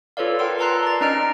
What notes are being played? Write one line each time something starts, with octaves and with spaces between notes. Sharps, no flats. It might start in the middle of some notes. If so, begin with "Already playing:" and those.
F4 A4 B4 C#5 D5 F5
A#4 F#5 G5 C6 E6
B4 A5 A#5 C6 F#6 C7
D5 A6
C#4 D#4 D#5 A#5 F6 D7